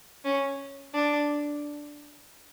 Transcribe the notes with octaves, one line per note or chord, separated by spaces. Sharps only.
C#4
D4